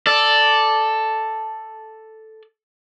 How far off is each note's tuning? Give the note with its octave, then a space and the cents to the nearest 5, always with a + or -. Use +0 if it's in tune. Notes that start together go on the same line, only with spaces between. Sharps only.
A4 +0 D5 +0